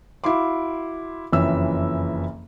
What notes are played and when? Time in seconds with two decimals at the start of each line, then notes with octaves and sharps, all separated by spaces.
0.24 E4 F#4 F5 C6 D6
1.32 F#1 F2 E3 C#4 E5 E6